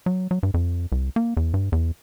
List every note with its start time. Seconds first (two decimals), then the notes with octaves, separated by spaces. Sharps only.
0.06 F#3
0.31 F#3
0.43 G2
0.54 F2
0.92 C2
1.16 A#3
1.37 E2
1.54 G2
1.72 E2